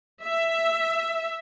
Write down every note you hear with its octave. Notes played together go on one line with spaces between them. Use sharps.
E5